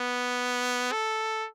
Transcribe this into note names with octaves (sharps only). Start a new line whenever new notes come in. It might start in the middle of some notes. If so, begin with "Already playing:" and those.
Already playing: B3
A4